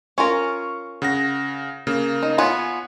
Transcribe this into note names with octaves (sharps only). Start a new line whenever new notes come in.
C#4 F4 A#4 C#6
C#3 F#5 A#6
C#3 A#3
D#4
B3 F4 C#5 G#5